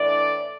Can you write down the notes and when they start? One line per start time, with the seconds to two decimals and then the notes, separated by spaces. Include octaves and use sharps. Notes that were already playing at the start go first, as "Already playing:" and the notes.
Already playing: A2 E3 A3 D4 D5